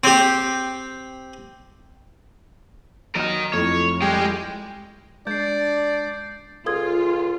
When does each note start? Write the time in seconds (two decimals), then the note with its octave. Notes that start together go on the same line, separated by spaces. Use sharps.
0.04 C4 G4
3.16 F#3 A#4 D#5 F6
3.53 F2 A3 E4 C#5
4.02 G3 G#3
5.27 G#3 D4 D5 G6 C7
6.66 C#2 F4 A4 D#6 G#6